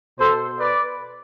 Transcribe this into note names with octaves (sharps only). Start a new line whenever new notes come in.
B2 A4 C5
B4 D5